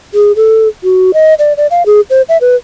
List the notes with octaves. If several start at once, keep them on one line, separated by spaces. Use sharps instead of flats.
G#4
A4
F#4
D#5
D5
D5
F5
G#4
C5
E5
B4